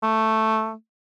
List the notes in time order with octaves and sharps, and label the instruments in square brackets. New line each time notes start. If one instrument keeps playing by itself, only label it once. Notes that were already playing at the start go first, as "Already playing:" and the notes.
[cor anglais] A3